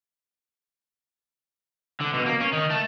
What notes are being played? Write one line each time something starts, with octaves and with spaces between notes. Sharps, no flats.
D3
B2
A#3
C#4
D#3
A3